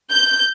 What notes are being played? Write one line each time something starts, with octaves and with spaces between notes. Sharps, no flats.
G6